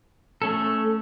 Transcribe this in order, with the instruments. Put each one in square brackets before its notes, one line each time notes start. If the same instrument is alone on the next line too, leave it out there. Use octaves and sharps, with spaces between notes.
[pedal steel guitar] A3 C#4 A4